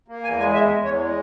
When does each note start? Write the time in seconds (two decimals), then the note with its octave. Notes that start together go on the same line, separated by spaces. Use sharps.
0.08 A#3
0.24 E2 G#5
0.39 G#3 G#5
0.54 E2 E5
0.70 E2
0.85 E2 C#5
1.01 G#3